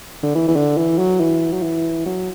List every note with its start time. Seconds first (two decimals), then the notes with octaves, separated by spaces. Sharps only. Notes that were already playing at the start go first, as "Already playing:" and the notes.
0.23 D3
0.35 E3
0.48 E3
0.56 D3
0.78 E3
0.99 F#3
1.20 E3
1.53 F#3
1.63 E3
2.06 F#3